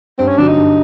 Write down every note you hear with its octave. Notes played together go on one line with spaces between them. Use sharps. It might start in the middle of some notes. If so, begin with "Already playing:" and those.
G2 C4
C#4
D3 F#3 D4
D#4
G2